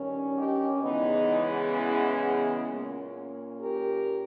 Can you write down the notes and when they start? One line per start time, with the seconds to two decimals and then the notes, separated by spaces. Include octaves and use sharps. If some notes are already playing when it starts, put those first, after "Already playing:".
Already playing: G2 D#3 G3 C#4
0.36 D#4 G4
0.83 E2 C#3 E3 G#3 B3 D#4
1.77 E4
2.69 A#2 A#3 C#4
3.62 G4 A#4